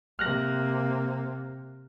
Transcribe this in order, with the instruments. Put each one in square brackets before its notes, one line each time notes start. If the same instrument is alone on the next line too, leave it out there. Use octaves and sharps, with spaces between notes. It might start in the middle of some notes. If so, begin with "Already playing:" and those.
[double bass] C3 A#3 [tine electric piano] F6 F#6 A#6